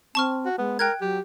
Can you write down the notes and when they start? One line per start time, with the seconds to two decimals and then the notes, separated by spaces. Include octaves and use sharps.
0.15 C4 A5 C#6 F6
0.46 F#4
0.58 G#3 B3
0.79 A#4 G5 F#6 G#6
1.01 F#3 G4